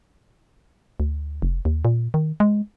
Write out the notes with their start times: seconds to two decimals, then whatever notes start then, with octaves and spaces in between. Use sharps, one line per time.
1.00 D2
1.42 F1
1.65 D#2
1.85 A#2
2.14 D#3
2.40 G#3